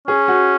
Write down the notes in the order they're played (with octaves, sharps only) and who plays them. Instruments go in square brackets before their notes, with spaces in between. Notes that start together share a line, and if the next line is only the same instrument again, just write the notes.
[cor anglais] C#4 [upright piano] G#4
[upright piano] F#4